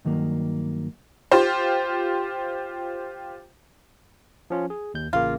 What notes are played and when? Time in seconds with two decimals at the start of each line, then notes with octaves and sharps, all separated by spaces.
0.05 G2 D#3 F#3 A#3
1.32 F4 G4 C5
4.50 F3 C#4 F4
4.70 G#4
4.94 D#2 G6
5.13 A1 C#3 A#3 F4